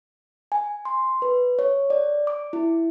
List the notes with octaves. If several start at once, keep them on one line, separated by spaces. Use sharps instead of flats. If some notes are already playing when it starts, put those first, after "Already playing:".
G#5
C6
B4
C#5
D5
D6
E4